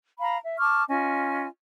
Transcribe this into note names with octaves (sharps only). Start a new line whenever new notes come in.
F5 A#5 B5
E5
A5 C#6 D6 F6
C#4 F4 D#5 G#5